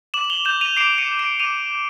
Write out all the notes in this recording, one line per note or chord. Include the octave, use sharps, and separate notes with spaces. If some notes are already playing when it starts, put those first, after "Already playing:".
D6 E7 F#7
F#7
F7 G7
G6 E7 F#7
D#7 F7
D6 C7 D7
C#7 D#7
G6
D7 E7
D6 D#7 F7
G6